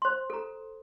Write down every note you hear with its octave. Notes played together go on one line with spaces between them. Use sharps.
C5 C6
A4 A#5